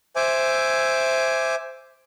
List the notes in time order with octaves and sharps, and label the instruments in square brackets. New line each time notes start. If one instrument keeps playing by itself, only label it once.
[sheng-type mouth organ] C5 E5 G#5 D6